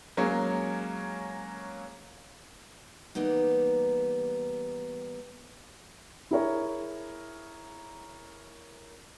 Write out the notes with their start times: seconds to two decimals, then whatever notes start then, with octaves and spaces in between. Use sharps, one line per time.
0.17 F#3 G#3 A#3 C#4
3.15 E3 G3 A#3 B3 D#4
6.31 E4 G#4 A#4 C#5